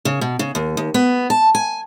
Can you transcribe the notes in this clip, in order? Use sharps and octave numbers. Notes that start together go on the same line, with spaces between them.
C#3
B2
C#3
D#2
D#2
B3
A5
G#5